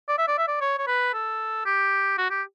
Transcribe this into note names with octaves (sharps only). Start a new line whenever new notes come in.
D5
E5
D5
E5
D5
C#5
C#5
B4
A4
G4
F#4
G4